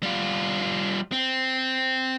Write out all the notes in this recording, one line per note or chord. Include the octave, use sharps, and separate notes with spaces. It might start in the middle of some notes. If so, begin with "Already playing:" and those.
G3 F4
C4